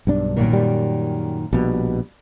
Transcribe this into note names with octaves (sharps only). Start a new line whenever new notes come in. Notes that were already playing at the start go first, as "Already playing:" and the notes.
B1 G2 D4
F#2 A#2 D#3
G3
A#1 B2 G3